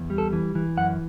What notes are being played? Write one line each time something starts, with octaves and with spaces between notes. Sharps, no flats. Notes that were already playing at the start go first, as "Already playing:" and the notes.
Already playing: E2
G3
A4
E3
E3
F#2 F#5